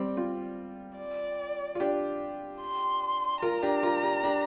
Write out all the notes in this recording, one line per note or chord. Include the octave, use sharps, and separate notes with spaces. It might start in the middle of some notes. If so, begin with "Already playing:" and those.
Already playing: G3 C4 D5
C4 F4
D5
F4
D4 G4
C6
F4 A#4 A#5
D4 G4
F4 A#4
D4 G4
D4 G4